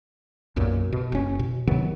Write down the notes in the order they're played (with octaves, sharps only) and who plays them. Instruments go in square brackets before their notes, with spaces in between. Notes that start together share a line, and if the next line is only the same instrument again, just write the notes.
[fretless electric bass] B1 F#2 A#2
B2
F#1 C#4
B2
C3 D#3 F#3 B3